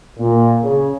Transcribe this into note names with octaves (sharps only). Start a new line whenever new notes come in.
A#2
C#3